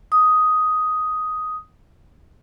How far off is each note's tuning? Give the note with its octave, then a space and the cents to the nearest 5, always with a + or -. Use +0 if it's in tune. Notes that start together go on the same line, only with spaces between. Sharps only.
D#6 +5